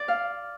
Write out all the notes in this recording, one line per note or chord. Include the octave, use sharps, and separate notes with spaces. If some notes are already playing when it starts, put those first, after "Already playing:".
Already playing: D5
F5